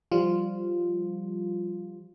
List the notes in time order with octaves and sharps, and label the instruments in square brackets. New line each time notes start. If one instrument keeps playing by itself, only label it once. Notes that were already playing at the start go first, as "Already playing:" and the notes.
[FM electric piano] F3 G3 F4